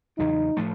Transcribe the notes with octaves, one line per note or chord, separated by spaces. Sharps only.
E2 C#3 F#3 D#4
A2 F3 A3